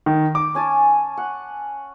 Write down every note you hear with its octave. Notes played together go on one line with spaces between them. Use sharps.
D#3
D6
C#4 G#5 A5
F#5